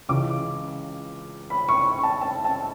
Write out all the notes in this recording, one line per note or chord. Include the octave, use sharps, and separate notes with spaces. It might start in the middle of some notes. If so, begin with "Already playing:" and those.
C#2 C#3 E3 G#3 D6
B5
C#6
C#6
A5
A5
A5